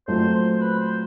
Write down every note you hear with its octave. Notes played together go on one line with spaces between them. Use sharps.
A#2 F#3 A3 C4 C5
C5
B4
C5